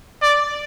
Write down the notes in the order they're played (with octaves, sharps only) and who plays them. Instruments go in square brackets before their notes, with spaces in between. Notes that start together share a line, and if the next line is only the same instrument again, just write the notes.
[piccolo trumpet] D5